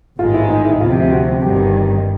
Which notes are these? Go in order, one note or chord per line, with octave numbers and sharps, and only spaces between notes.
A1 G#2 D#3 G#3 F4
E4
D#4
E4
D2 C3 F3 F4
F#4
G1 G2 D#3 G4